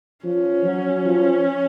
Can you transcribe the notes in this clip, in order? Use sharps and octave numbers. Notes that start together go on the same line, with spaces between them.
F3 C#4
F#3
F3